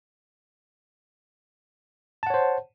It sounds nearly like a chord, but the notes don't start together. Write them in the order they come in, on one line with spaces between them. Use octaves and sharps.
A5 F#5 C#5 C5